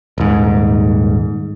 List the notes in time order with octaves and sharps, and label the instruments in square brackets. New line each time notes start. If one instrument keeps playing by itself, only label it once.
[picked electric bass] D#1 G#2